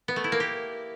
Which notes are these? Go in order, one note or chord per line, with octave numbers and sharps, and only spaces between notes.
B3
A3
E4
A#3
G4